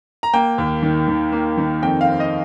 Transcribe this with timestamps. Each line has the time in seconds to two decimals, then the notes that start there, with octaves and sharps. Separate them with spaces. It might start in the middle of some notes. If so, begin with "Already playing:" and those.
0.23 A#5
0.33 A#3 G5
0.58 D#2
0.82 D#3
1.08 D#3
1.32 A#3
1.57 D#3
1.82 F2 G5
2.01 F5
2.07 C4
2.20 D#5